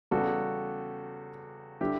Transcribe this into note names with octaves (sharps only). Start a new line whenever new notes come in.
E2 C#3 G3 F#4 A4
D3 G3 D4 E4 G4